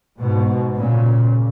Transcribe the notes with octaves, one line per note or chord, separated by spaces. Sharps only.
G#2 B2
A#2 C#3